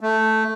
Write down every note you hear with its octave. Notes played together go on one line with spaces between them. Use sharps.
A3